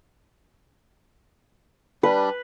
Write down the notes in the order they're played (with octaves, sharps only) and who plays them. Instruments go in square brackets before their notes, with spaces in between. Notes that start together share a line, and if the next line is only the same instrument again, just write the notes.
[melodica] G3 D4 [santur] B4